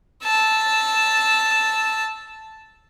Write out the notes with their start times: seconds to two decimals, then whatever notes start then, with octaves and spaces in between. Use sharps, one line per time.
0.24 A5 E6